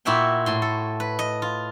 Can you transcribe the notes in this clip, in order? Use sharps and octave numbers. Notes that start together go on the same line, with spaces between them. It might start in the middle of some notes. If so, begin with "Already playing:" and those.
A#2 E4 F#4 E5 G5 C6
A2 C6
A4
B4
D#5
F4